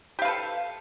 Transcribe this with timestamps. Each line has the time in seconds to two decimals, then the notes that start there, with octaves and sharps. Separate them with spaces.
0.19 G4
0.22 F5
0.25 B4
0.28 A4